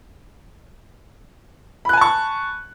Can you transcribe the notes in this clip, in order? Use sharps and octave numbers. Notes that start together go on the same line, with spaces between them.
G#5 A5 B5 C#6 F#6